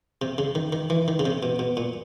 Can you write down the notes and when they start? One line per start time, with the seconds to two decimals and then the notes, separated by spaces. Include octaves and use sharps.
0.22 C3
0.38 C#3
0.55 D#3
0.73 D#3
0.90 E3
1.08 D#3
1.19 C#3
1.25 C3
1.43 B2
1.59 B2
1.77 A#2